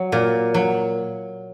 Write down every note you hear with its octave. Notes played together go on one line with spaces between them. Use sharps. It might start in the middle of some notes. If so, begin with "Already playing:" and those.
Already playing: F#3
A#2
F#3